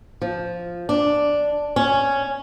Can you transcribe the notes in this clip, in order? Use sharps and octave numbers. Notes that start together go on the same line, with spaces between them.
F3
D4
C#4